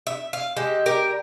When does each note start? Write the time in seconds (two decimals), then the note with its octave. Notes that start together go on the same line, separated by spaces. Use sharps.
0.07 E5
0.33 F5
0.57 G#3 G4 A4
0.86 G3 G4 A#4